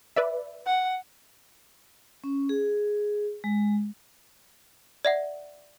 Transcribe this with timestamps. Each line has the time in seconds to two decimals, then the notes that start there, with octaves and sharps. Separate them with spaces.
0.16 B4 D5 E5
0.66 F#5
2.24 C#4
2.49 G#4
3.44 G#3
5.05 D5 E5 F#5